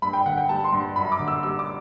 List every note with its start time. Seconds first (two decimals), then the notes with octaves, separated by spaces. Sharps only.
0.02 G2 B5
0.13 G5
0.26 D3 F#5
0.38 G5
0.49 G3 A5
0.64 C6
0.72 G2
0.96 F#2 B5
1.12 D6
1.19 D3
1.28 E6
1.43 G3 E6
1.59 D6